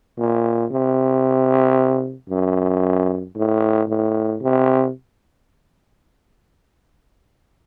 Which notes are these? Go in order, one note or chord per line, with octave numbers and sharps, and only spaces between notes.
A#2
C3
F#2
A2
A2
C3